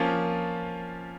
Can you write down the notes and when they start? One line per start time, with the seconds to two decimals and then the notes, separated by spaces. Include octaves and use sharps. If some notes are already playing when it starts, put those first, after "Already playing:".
Already playing: F3 A#3 C#4 F4